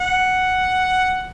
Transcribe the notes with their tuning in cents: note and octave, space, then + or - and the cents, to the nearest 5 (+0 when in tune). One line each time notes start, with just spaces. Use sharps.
F#5 +5